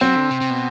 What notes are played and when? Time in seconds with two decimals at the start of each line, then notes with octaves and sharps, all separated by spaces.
0.01 F#3 C4
0.16 D3
0.31 C3
0.41 C3
0.50 B2